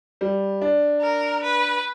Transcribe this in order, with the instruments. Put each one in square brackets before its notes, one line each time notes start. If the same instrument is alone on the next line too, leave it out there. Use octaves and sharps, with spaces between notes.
[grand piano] G3
D4
[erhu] A#4
B4